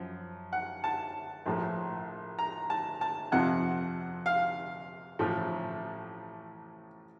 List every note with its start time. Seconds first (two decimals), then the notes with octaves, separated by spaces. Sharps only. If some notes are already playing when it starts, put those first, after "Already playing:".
Already playing: F#2 F3
0.53 F#5
0.84 A5
1.46 A#1 A2 F3 A3
2.39 A#5
2.70 A5
3.01 A5
3.32 F2 C3 F3 F#5
4.26 F5
5.19 A1 A2 F3 A3